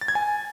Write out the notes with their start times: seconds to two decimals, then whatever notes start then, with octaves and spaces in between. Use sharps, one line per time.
0.01 A6
0.08 G#6
0.15 G#5